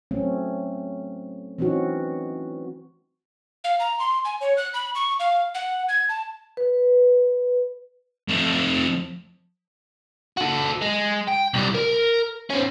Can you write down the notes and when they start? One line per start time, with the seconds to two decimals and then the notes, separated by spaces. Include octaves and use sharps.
0.11 F#3 A3 C4 C#4
1.58 E3 C4 C#4 D#4 F#4
3.64 F5
3.80 A#5
3.99 C6
4.25 G#5
4.41 C#5
4.57 F#6
4.74 B5
4.95 C#6
5.20 F5
5.55 F#5
5.89 G#6
6.09 A5
6.57 B4
8.29 F2 A3
10.37 F#4 A4
10.82 G#3
11.28 G5
11.54 C2 G3
11.74 A#4
12.50 C#4 C5